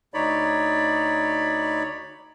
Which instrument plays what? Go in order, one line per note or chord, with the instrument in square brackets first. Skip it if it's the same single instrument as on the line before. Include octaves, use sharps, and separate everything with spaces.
[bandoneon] D2 D#4 C#5 D5 B5